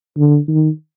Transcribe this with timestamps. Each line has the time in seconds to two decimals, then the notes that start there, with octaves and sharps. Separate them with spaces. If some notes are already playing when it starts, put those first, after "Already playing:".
0.17 D3
0.48 D#3